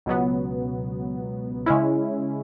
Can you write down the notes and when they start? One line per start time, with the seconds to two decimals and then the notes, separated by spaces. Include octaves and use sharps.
0.06 C#2 B2 F#3 B3
1.66 C#3 G#3 C#4 E4